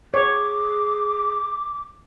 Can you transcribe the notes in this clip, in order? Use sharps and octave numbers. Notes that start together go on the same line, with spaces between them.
G#4 C#5 D6